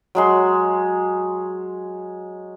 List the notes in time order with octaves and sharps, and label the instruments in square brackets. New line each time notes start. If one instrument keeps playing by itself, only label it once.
[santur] F#3 G#3 C6